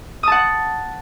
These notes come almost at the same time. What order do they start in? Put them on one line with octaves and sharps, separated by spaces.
D#6 A5 F#5